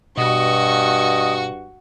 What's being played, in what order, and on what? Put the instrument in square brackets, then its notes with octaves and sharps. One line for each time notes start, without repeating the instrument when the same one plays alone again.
[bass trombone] G2 [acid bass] B2 [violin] F#4 C#6 [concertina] D#5